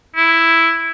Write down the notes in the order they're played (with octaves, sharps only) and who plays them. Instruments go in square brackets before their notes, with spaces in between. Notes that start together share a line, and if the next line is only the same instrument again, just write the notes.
[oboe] E4